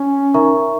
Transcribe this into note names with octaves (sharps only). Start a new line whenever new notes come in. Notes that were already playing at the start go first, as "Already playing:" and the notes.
Already playing: C#4
D#4 A#4 E5 A#5 C#6